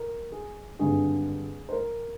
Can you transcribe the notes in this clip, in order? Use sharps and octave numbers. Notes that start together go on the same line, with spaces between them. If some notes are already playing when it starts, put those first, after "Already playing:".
Already playing: A#4
G#4
G#1 G2 D3 G#4
C5
A#4